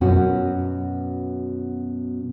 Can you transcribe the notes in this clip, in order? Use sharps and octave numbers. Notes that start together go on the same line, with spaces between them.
F#2 B2 B3 C#4 F#4